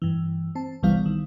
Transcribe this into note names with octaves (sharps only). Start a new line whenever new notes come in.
G2 E3
C4 A5
G1 C2 E3 G3 B3 F5
D#3